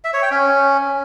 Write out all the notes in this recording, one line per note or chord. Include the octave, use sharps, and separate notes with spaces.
E5
C#5
G5
C#4